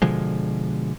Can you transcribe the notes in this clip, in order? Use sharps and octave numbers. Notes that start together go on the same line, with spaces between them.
B2 D3 F3 G#3